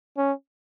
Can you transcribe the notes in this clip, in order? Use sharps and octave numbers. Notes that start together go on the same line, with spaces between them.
C#4